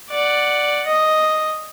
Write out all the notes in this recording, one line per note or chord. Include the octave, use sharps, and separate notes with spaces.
D5 F#5
D#5